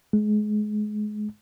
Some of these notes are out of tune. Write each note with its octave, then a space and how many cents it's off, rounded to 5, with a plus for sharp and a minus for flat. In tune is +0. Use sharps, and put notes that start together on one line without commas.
G#3 +25